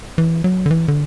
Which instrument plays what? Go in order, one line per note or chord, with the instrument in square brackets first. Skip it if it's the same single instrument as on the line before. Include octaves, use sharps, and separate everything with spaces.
[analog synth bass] E3
F#3
D3
E3
D3